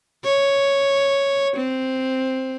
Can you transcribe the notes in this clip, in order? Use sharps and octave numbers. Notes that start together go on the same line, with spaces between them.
C#5
C4